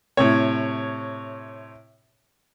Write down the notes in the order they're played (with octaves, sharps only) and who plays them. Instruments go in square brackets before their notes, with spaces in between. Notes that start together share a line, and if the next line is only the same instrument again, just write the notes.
[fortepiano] A2 C3 C#5